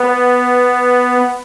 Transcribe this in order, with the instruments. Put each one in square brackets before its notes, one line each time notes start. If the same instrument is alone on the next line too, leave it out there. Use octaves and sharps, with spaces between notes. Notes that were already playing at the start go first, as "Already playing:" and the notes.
Already playing: [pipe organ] B3